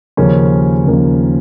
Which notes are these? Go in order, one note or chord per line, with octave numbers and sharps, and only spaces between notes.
D#2 C#3 F3 A#3 C#4
D#2 C#3 F3 A#3 C#4